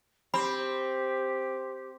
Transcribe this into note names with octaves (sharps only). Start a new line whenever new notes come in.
C4 G4 B5